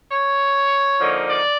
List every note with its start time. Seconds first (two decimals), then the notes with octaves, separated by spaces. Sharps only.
0.12 C#5
0.99 D3 F3 A#3 D#4
1.28 D5